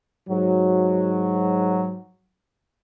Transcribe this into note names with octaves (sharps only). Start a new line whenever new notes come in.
G#2 F#3